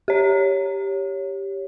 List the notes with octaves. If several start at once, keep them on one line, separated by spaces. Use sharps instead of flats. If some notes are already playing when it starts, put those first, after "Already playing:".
G4 C#5